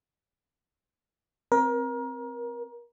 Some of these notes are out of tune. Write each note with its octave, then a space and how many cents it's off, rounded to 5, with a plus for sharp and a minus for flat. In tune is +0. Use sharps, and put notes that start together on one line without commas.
C4 +0 A#4 +30